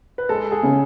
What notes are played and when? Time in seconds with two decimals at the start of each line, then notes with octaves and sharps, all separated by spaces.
0.18 B4
0.29 G#3 A4
0.51 G#4
0.63 C#3